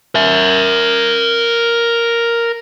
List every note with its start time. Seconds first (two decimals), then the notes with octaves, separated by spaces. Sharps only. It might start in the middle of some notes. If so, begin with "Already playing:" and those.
0.15 A#4 E5